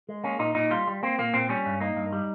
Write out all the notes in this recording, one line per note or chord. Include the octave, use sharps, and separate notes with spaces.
G#3
A#3 C#4
A#2 D#4
A#2 D#4
G3 F4
G3
A#3 C4
A#2 A#3
A#2 C4
G3 C#4
G2
A#3 D#4
G2
G3